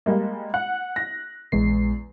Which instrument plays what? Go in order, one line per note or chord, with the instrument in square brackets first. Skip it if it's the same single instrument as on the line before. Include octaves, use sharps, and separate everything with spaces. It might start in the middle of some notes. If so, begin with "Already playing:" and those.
[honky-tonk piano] G3 G#3 A#3
[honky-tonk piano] F#5 [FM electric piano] F#6
[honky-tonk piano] A#6
[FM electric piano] A#1 G#3 C7 [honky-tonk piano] E2